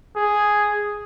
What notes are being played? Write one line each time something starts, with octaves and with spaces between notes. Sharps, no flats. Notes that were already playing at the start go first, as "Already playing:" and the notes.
G#4